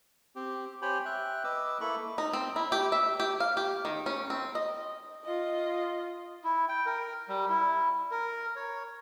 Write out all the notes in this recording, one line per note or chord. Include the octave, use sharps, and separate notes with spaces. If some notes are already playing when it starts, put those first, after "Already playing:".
C4 G4
G4 C5 C#5 G5 G#5 B5
E5 G5 F#6
B4 D#5 D6 E6
A#3 E4 A4 B5 C#6
D#4
C4
E4
G4
E5
G4
F5
G4
D#3
C#4
C4
D#5
F4 D#5
E4
G5
A#4
G3
E4
A#4
C#5